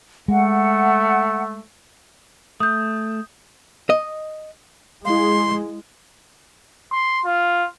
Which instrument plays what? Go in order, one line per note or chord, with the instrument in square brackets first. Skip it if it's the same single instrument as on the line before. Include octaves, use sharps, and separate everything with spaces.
[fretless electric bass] G#3 [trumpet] A3 [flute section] F#5
[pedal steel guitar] A3 [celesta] D#6 G6
[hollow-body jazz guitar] D#5
[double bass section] G#3 [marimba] E4 F5 [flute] C6
[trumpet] C6
F4